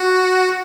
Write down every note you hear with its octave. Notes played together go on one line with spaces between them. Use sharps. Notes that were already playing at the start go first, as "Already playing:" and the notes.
Already playing: F#4